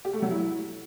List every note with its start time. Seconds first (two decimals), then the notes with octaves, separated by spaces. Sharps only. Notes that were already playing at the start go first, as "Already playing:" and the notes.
0.05 G4
0.13 A3
0.22 F#3
0.31 E4